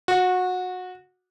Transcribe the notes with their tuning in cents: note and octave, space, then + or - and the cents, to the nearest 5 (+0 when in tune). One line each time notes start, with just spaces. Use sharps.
F#4 -20